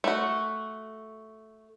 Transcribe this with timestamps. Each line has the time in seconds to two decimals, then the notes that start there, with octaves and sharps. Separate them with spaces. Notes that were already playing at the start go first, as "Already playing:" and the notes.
0.04 A3 F#4